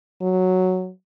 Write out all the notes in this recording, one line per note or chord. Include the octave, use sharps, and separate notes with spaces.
F#3